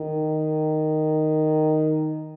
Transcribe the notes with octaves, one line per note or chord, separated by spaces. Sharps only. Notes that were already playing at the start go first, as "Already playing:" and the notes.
Already playing: D#3